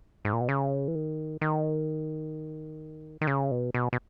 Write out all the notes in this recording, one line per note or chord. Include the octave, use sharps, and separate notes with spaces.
G#2
A#2
B2
C#3
E3
D#3
D#3
D#3
C#3
B2
B2
B2